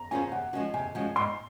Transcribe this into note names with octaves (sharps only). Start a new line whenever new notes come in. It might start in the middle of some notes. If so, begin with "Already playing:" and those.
Already playing: A#5
C#4 F4 G#4 C5 G#5
C3 F#5
F3 G#3 C#4 F#4
C3 G#5
F3 G#3 C#4 F#4
G#2 C6